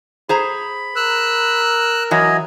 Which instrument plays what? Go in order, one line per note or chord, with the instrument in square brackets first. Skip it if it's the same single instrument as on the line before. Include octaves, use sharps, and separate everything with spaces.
[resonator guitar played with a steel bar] G#4 C5 A#5 [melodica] B5
[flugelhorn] A#4 [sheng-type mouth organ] E6 F#6
[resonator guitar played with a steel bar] E3 F#3 [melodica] D#5 G#5